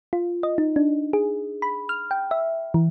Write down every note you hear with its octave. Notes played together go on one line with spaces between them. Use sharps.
F4
D#5
D#4
D4
G#4
B5
F6
G5
E5
E3